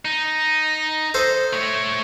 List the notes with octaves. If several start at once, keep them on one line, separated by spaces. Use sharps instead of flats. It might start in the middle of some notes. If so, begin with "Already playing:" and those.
D#4
A4 C5 D#5
A3 C#5